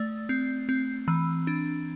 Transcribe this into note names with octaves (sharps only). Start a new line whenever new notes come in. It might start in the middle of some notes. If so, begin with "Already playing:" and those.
Already playing: A3 D5
C4
C4
E3
D4